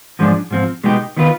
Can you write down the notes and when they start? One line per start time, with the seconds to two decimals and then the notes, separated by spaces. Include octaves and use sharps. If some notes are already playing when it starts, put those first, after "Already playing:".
0.19 G#2 F3 G#3 D4
0.51 G#2 F3 C4
0.84 B2 G#3 B3 D#4 G4
1.17 D#3 B3 F4 B4